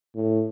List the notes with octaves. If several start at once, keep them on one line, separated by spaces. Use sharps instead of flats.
A2